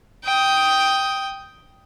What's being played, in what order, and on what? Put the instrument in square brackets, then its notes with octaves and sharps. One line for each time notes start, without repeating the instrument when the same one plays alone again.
[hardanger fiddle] G5 D#6